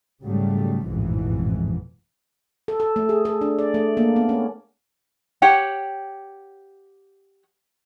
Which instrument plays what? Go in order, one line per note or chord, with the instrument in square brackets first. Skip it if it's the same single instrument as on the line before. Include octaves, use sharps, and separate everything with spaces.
[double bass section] G#2 C#3 F#3 G3 A3
A1 F2 G#2 B2 E3
[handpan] A4
A4
A3
G#4
A4
D4
D5
A3
A#3
B3
C#4
[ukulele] G4 C#5 F#5 G5